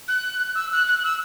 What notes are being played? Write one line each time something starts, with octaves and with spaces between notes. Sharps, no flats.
F#6
E6
F#6
F#6
E6